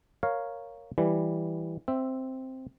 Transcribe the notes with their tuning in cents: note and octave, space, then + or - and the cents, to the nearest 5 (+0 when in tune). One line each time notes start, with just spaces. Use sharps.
A#4 +0 C#5 +0 F5 +0
E3 +0 G3 +0
C4 +0 E5 +0